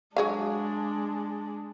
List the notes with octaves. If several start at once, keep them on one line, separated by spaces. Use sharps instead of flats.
F#3 G#3 D4 G#4 F5